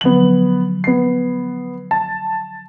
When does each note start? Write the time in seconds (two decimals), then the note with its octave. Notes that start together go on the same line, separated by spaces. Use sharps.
0.01 D3 F3 F#3 B3 F#7
0.84 B3 C7
1.91 A5